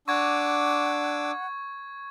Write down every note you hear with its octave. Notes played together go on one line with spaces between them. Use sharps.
D4 F#5 C#6 D6 E6 G#6